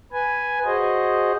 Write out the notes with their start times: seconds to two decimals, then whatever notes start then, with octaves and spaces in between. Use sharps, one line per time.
0.12 B4 G#5
0.65 F#4 G#4 C5 D#5